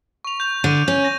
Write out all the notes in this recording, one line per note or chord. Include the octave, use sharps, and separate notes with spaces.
C#6 F7
G6 F7
D3 D#7
C#4 G6
A#6